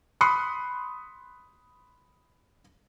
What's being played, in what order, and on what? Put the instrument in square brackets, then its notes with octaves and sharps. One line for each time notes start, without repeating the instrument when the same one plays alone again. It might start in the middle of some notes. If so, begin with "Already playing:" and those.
[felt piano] B5 C6 D#6 F#6 C7 C#7